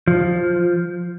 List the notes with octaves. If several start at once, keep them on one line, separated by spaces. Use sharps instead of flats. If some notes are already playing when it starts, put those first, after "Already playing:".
F3